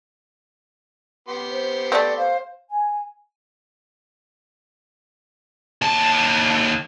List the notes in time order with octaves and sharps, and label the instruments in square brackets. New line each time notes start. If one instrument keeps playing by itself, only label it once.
[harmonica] B3 G4 C6
[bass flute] C5
[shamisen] A3 C4 [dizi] D5
[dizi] C5 [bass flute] F5
[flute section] G#5
[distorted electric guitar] D#2 A5